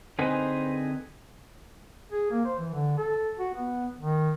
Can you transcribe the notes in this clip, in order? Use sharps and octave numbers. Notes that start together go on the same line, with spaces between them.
D3 C4 D#4 G#4 B4 C5 G#5
G#4
A#3
C5
E3
D3
A4
F#4
B3
D#3